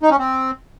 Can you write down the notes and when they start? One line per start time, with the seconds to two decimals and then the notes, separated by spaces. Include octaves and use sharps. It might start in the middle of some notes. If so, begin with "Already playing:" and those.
0.03 D#4
0.11 C#4
0.19 C4